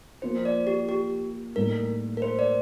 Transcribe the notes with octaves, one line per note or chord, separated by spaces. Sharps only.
F3 A#3 F4 C5
D5
G4
G4
A2 G3 A#3 D#4 A#4
A#4
C5
D5